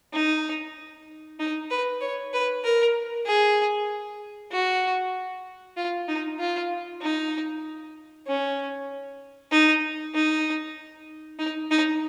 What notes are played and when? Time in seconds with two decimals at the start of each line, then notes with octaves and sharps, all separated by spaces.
0.13 D#4
1.40 D#4
1.70 B4
2.01 C#5
2.33 B4
2.64 A#4
3.26 G#4
4.52 F#4
5.77 F4
6.08 D#4
6.39 F4
7.02 D#4
8.27 C#4
9.51 D#4
10.14 D#4
11.39 D#4
11.71 D#4